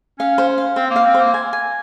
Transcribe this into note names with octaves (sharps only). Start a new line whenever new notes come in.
C#4 F5
C5
F5
C4 C5
A#3
F5
C4
C5
A#3
G#5
G#5